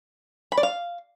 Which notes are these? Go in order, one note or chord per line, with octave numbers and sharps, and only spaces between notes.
B5
D5
F5